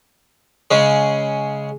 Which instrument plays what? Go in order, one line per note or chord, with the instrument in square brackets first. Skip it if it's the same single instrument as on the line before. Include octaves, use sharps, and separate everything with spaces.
[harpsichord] C#3 G#3